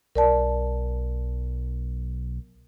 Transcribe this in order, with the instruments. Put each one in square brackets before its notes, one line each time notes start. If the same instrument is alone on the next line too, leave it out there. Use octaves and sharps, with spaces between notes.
[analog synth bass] B1 [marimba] A#4 D5 A5